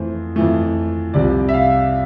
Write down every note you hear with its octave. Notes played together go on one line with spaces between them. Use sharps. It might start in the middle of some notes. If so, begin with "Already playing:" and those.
Already playing: F2 E3 A3 C5
F2 E3 A3
C2 C3 F3 D5
E5
F5